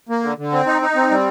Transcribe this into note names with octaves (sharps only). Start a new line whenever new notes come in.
A#3
D3
D3
C4
D#4
D#4
C4
G3